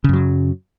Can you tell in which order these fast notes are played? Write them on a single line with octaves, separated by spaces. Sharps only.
C#3 F#2 F#3